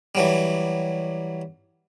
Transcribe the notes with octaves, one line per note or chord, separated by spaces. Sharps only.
E3 F#3 G3